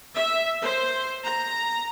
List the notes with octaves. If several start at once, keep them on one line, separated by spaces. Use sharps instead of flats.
E5
C5
A#5